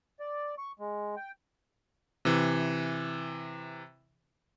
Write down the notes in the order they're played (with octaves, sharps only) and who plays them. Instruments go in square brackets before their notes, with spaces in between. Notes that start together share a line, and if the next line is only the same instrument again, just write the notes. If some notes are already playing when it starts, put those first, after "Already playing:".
[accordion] D5
C#6
G#3
G5
[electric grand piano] C3 E3